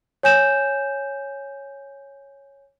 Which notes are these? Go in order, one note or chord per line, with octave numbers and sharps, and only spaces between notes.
C#5 G#5 G6 E7